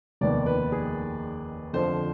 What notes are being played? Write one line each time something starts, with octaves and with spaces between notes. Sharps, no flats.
F1 D#2 D#3 B3 D5
B4
G#4
F2 D3 F3 C5